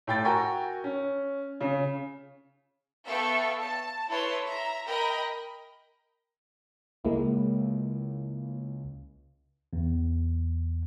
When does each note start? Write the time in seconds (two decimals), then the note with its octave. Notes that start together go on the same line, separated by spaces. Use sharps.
0.07 A2 G5 A6
0.24 F#4 A#4 G5 G#5 A#5 C#6
0.84 C#4
1.61 C#3
3.06 B3 A4 E5 F5 G5 C#6
3.62 A5
4.09 E4 A4 B4 C#5 C6
4.46 E5 A#5
4.88 A#4 D#5 G5 B5
7.05 C#2 G#3 A#3 E4
9.73 E2